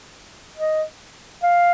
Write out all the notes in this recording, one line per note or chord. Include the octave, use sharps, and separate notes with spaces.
D#5
F5